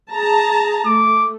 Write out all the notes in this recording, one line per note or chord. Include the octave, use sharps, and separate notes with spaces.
G#4 A5 A#5
A3 D6